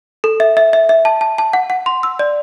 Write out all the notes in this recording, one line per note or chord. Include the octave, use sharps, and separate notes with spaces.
A4
E5
E5
E5
E5
A5
A5
A5
F#5
F#5
C6
E6
D5